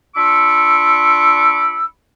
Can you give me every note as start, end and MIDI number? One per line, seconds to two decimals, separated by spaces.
0.15 1.85 62
0.15 1.85 65
0.15 1.85 83
0.15 1.85 85
0.15 1.85 86
0.15 1.85 88